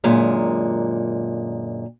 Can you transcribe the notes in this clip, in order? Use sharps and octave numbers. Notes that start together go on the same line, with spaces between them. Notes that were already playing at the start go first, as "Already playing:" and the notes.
F#2 A#2 D3 G#3